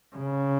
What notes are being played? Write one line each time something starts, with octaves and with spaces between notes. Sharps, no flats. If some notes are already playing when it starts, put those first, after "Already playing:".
C#3